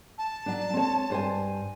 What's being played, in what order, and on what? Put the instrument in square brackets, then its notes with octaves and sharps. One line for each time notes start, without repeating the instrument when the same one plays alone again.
[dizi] A5
[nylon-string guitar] F#3 D4
C4 C#5
G2 C5 G#5